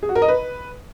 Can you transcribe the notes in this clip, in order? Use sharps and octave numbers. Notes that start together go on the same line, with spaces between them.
G#4
F#4
A#4
D#5
B4